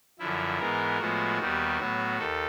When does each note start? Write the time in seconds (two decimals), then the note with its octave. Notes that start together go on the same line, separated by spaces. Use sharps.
0.19 F#2 D3 F3 E4
0.59 G#2 E3 G#3 B3 A#4
0.99 A2 F3 G#3 B3 F#4
1.39 D#2 D#3 G3 B3
1.79 A2 F#3 B3
2.18 D#2 A4